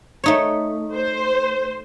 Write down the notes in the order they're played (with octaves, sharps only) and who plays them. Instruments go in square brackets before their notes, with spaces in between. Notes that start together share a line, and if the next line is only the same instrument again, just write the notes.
[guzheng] A3 D#4 C#5
[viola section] C5